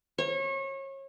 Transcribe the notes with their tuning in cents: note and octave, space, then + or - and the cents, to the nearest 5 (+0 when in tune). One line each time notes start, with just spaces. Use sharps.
C#5 -30